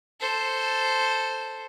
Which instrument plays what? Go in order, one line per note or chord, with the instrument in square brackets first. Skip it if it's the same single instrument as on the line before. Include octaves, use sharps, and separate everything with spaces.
[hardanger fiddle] A4 C5